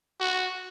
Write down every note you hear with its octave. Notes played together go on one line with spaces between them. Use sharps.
F#4